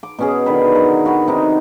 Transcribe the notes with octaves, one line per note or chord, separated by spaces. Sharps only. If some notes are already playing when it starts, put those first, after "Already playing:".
D6
B2 C#4 G#4
D3 D#3 B4
A#4 F#5
F#4 B4
C3 D#4